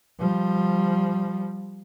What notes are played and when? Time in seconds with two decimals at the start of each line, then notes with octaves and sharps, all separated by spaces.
0.19 F3 G3